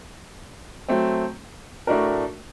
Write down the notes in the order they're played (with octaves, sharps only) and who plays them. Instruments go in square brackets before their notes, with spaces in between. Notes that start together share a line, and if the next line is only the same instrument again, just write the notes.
[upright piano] F#3 A3 C4
A2 A3 D4 F#4 A#4